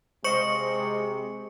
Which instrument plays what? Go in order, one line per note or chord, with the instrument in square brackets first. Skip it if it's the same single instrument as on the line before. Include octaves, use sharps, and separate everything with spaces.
[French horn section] C3 G#3 [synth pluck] C5 D#5 F5 [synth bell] C#6 C#7